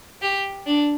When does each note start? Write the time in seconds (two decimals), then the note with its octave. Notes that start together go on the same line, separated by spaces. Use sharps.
0.22 G4
0.66 D4